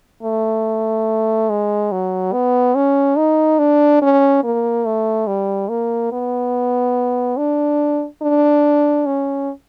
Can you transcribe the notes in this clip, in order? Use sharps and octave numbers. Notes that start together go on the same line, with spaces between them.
A3
G#3
F#3
B3
C#4
D#4
D4
C#4
A#3
A3
G3
A#3
B3
D4
D4
C#4